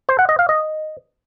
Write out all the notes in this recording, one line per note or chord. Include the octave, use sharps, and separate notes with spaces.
C5
F#5
D#5
F5
D#5